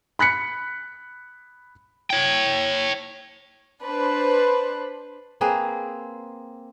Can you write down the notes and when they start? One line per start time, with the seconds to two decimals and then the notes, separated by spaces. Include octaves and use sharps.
0.19 B5 F#6 B6 C#7
2.10 C#5 G5
3.81 D4 B4 C5
5.41 A#3 C4 G#4 B4